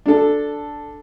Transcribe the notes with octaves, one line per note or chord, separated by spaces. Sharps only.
D4 A4